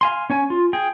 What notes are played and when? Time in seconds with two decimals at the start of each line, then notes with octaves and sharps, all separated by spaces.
0.01 F5 G#5 C6
0.30 C#4 C#5 G#5
0.50 F4
0.73 G#4 G5